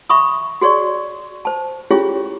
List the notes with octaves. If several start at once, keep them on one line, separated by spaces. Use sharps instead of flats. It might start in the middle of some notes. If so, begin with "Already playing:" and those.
E5 B5 C#6 D#6
F#4 G#4 C#5 D5 C#6
C5 A5
C#4 E4 F4 G4 G#4 C#5